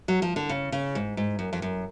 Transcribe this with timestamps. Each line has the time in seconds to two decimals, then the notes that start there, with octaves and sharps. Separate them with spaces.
0.08 F#3
0.22 F3
0.36 D3
0.49 C#3
0.72 C#3
0.95 G#2
1.17 G#2
1.39 F#2
1.53 F2
1.62 F#2